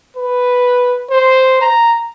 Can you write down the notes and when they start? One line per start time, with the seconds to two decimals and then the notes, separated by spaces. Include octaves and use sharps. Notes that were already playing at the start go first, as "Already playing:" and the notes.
0.17 B4
1.11 C5
1.61 A#5